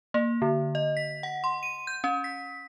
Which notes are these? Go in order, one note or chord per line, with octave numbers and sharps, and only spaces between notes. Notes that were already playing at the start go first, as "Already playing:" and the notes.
A#3
D3
D#5
B6
F#5
C6
D#7
G6
C#4
B6